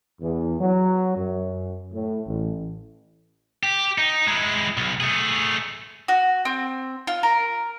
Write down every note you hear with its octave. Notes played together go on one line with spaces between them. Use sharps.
E2
F#3
F#2
A2
A1
G4
D#4
G#3 E4
B1
A3 G#4
F#4
C4
F4
A#4